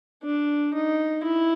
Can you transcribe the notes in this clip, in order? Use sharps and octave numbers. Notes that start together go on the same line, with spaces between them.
D4
D#4
E4